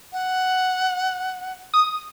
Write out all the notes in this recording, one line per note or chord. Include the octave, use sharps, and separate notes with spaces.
F#5
D#6